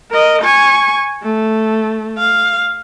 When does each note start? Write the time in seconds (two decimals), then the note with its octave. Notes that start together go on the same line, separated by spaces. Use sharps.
0.11 A#4 D#5
0.42 G#5 C#6
1.22 A3
2.18 F5